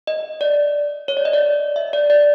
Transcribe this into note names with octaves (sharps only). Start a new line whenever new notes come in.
D#5
D5
C#5
D5
D#5
D5
E5
D5
D5